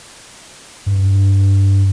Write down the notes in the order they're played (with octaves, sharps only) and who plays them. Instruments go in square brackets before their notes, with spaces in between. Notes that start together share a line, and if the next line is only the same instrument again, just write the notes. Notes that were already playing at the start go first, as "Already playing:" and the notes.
[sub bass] G2